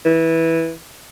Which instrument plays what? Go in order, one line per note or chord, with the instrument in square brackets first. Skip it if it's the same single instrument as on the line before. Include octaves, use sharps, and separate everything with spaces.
[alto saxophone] E3